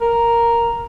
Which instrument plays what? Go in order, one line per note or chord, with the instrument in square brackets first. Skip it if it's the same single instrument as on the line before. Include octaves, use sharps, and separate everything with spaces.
[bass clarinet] A#4